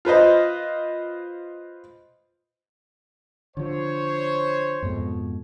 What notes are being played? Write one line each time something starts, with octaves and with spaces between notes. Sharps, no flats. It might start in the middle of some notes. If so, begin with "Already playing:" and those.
F4 B4 C5 D#5
D3 F3 C5 C#5
F2 G#2 B2